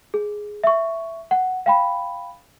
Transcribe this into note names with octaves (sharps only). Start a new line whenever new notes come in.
G#4
E5 C#6
F#5
F5 G5 B5